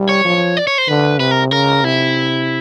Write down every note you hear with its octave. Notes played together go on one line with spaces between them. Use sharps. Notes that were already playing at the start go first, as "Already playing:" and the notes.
Already playing: G3
C#5
F3
D5
C#5
C5
D3 B4
C3 B4
A#4
C#3 A#4
C3 E4